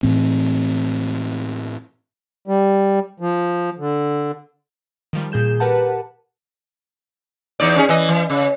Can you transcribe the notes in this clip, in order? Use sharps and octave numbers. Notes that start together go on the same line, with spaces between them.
A2 E3 C4
G3
F3
D3
D#3 F3 G3
A#2 G#4 G6 E7
G4 A#4 B4 F#5 A5
E2 D#4 D5
C#4 D#4 G#4
E3 D#5
E3
C#3